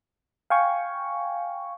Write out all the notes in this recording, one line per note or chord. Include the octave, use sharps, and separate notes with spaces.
F5 G5 G#5 C#6